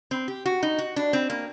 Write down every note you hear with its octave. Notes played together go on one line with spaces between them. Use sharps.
C4
G4
F#4
D#4
F#4
D4
C4
A#3